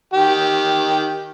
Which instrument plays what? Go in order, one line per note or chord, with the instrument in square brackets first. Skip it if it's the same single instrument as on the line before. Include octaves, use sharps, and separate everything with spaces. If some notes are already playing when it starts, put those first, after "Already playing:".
[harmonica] D#3 G4